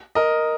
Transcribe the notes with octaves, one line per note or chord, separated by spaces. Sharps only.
A#4 D#5